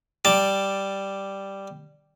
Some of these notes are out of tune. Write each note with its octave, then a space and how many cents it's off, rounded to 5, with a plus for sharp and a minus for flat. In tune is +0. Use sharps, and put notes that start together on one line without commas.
G3 +0 A5 +0 D6 +0